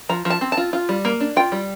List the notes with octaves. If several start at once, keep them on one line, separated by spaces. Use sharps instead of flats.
F3 A#5
F3
A5
C4
A5
F4
F4
G3
A#3
D4
F4 G5
G3